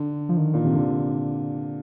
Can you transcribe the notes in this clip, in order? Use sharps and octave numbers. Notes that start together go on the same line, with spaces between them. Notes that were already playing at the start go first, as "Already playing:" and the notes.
Already playing: D3
F3
D#3
A#2
C3
D3